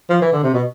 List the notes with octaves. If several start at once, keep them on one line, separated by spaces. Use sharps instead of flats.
F3
E3
D3
C3
B2